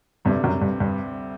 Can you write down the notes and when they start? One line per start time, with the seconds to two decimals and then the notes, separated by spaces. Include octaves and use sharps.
0.25 D2 G2 C3 G3
0.44 F#2
0.62 G2
0.80 G2